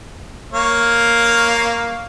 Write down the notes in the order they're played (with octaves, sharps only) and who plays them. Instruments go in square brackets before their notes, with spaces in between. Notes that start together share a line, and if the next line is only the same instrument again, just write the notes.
[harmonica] A#3 C#5 F5